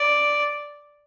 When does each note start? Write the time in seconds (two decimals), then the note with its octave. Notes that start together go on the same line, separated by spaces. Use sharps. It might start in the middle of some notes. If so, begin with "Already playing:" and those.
Already playing: D5